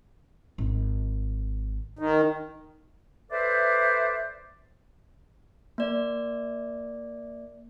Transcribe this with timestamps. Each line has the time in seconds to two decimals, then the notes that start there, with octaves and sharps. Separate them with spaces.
0.58 G#1
1.99 D#3
3.32 A4 B4 C5 D5 E5
5.78 A#3 D5